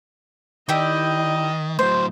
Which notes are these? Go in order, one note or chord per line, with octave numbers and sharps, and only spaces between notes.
D#3 E4 G4 D5 D#5
A2 F#3 C5